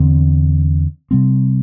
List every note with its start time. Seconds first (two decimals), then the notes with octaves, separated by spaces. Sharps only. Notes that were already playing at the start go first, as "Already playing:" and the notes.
Already playing: E2 D3 C4
1.11 C3 G3 C4